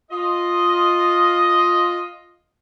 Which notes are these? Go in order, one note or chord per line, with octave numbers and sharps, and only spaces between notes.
F4 D#5